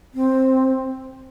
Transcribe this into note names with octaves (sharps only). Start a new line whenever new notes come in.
C4